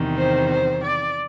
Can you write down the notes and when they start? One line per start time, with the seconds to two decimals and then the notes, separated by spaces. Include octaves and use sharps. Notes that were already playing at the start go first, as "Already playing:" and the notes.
Already playing: E2 C3 D#3 G3
0.18 C5
0.50 C5
0.83 D5